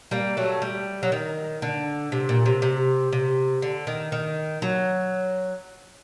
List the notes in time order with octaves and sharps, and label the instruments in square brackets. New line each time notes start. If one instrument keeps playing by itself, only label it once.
[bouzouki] G3 A#3
F#3 A3
G3
F#3
D#3
D3
C3
A#2
C3
C3
C3
D3
D#3
D#3
F#3